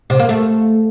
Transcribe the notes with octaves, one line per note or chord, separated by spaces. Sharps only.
C3
A#3
A3